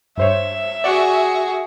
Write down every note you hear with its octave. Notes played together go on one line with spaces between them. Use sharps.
G2 C5 C#5 E5
F#4 G#4 D5 F#5 C#6